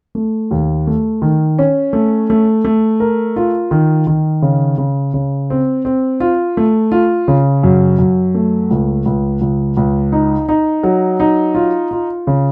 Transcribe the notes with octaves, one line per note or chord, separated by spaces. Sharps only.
A3
D#2
A3
D#3
C#4
A3
A3
A3
A#4
F4
D#3
D#3
C#3
C#3
C#3
C4
C4
F4
A3
F4
C#3
F#2
F#2
A3
C#2
C#2
C#2
C#2
D#4
D#4
F#3
D#4
F4
F4
C#3